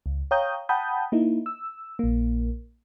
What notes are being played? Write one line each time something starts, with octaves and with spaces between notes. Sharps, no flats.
C#2
C#5 F5 G5 A#5 D#6 G6
F#5 G5 A5 B5 D#6 G6
A#3 D#4 E4
E6
A#1 A#3